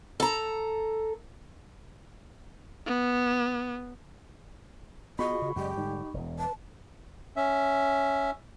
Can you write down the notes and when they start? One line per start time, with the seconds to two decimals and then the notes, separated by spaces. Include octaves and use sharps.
0.20 A4 A#5
2.86 B3
5.19 B3 F4 F#4 G#4 D#5 B5 C#6
5.42 C#3
5.56 F#2 C#3 G#3 G4 D5 D#5 G5
5.77 G#2 D3 G3 D#4
6.14 E1 E2
6.39 B4 A5
7.36 C#4 E5